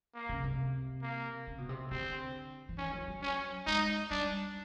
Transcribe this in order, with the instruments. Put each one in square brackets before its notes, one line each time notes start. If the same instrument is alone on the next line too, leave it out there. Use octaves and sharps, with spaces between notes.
[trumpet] A#3
[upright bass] C#3
C3
[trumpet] A#3
[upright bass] C#3
B2
C3
[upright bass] D3 [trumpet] C4
[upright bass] E3
[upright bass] D#3 [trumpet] C#4
[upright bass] F3
F#3
[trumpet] C#4
[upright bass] G#3 [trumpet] D#4
[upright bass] G3 [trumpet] D4